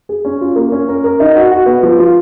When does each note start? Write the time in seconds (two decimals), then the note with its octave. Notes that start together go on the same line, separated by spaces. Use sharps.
0.09 G#4
0.25 C#4
0.41 F4
0.56 A#3
0.72 C#4
0.89 A#4
1.04 A#4
1.20 D#4
1.35 F#4
1.51 F#4
1.66 B3
1.83 F3
1.98 F4